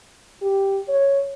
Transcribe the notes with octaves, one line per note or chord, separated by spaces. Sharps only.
G4
C#5